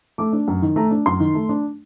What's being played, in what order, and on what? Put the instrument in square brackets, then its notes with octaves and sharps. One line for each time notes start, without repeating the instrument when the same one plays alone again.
[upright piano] A3 D6
D4
F#2
D#3
A3 A#5
D4
F#2 C6
D#3
A3
D4